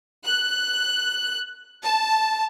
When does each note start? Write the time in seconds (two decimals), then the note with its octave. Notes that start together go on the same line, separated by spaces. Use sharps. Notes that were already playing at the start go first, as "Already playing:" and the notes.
0.24 F#6
1.84 A5